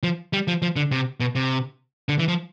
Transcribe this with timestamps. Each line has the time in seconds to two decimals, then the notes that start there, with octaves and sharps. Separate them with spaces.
0.03 F3
0.33 G3
0.48 F3
0.62 F3
0.76 D3
0.91 C3
1.20 B2
1.35 C3
2.09 D3
2.19 E3
2.28 F3